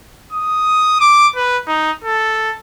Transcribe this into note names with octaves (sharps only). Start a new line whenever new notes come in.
D#6
D6
B4
D#4
A4